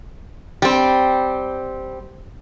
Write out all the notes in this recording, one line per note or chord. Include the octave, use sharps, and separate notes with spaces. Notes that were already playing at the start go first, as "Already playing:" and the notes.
G3 C4